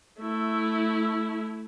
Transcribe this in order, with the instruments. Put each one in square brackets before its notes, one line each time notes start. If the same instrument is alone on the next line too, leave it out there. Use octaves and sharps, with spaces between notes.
[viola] A3 E4